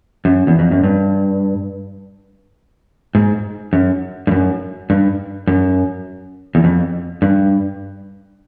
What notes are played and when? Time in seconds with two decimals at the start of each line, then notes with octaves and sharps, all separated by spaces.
0.25 F#2
0.47 E2
0.59 F2
0.71 F#2
0.84 G2
3.15 G#2
3.73 F#2
4.27 G2
4.31 F#2
4.90 G2
5.47 F#2
6.55 E2
6.64 F2
7.22 G2